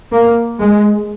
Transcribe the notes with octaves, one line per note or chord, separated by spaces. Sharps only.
A#3
G#3